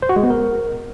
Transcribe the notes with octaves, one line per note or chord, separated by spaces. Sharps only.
C5
F#4
G#3
B3
A#4